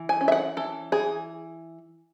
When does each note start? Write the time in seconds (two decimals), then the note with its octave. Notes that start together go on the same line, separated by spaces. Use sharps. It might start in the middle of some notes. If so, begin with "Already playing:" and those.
Already playing: E3
0.09 G#5
0.21 C#4
0.28 E5
0.32 F#5
0.57 E3 A4
0.92 E3 G#4